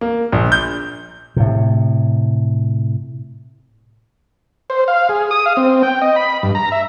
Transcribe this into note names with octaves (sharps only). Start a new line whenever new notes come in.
A#3
A#1
G6
A2 C3
C5
F5
G#4
D#6
F5
C4
G5
D#5
B5
G2
A#5
E5